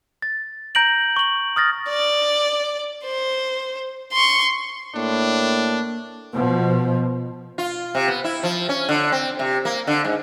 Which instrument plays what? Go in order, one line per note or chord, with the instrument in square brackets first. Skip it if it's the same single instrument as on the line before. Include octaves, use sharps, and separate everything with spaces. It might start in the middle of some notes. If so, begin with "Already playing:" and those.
[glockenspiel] A6
A#5 G6 A#6 D7 F#7
C#6 F#7
D#6 F6 A6 A#6
[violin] D5
C5
C6 C#6
[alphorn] A2 [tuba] A#3 [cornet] D4
[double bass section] B2 F3
[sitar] F4
C3
B3
E4
F3
C#4
D3
C4
C3
A#3
D3
G#2